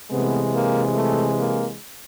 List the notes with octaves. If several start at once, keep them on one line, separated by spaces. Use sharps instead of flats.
C3 E3 G#3 A3 B3
A#3
A3
A#3